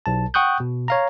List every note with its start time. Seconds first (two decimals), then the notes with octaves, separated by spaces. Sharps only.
0.06 B1 A5
0.34 F#5 G5 C#6 D#6 F#6 G6
0.60 B2
0.88 C#5 F5 A#5